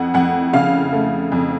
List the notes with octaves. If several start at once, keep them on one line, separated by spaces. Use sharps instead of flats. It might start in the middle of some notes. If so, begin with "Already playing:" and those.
Already playing: F2 F#5
F2 F#5
C#3 F5
A3
F2